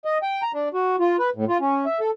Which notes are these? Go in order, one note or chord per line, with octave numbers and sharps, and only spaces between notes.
D#5
G5
A#5
D4
F#4
F4
B4
A2
F4
C#4
E5
A4